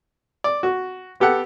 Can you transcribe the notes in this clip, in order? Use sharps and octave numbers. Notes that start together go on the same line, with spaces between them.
D5
F#4
B3 G4 A4 F#5